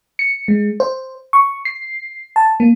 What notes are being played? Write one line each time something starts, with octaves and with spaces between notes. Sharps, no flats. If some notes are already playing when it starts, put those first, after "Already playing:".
C#7
G#3
C5
C#6
C7
A5
A#3